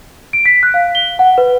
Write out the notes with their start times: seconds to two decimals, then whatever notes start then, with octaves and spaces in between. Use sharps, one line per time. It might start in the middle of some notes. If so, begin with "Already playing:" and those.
0.33 D7
0.45 B6
0.63 F#6
0.74 F5
0.95 G7
1.19 F#5
1.38 B4